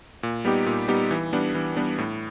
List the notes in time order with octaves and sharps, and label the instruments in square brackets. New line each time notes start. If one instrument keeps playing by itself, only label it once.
[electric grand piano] A#2
G3 B3 D#4 G4
A#2
G3 B3 D#4 G4
E3
G3 B3 D4
E3
G3 B3 D4
A2